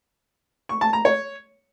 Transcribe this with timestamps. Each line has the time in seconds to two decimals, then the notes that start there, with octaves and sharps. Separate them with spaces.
0.69 C#6
0.81 A5
0.93 A#5
1.05 C#5